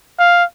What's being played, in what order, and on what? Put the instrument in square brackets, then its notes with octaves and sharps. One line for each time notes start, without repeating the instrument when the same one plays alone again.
[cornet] F5